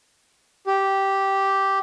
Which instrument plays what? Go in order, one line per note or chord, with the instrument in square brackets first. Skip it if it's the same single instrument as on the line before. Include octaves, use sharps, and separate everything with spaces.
[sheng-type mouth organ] G4